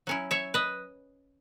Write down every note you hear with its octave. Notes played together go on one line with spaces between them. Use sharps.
F#3 C#4 E4
C#5 E5
B4 D#5